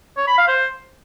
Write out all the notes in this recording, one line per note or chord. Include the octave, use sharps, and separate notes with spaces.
C#5
B5
F5
C5